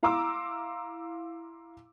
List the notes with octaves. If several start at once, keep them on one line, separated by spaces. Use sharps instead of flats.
E4 F5 A#5 C6 D6 E6